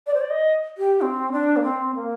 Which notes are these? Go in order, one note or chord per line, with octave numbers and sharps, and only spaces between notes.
D5
C5
D5
D#5
G4
C4
D4
A#3
C4
A#3